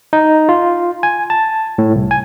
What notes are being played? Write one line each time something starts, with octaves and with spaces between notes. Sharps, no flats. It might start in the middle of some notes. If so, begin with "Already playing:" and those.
D#4
F4
G#5
A5
A2
C2
G#5